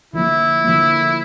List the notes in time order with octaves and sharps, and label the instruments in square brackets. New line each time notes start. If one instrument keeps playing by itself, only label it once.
[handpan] D3 F3 A#3 [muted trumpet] E4
[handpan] D3 F3 A#3